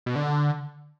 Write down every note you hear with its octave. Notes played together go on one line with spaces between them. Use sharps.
B2
D3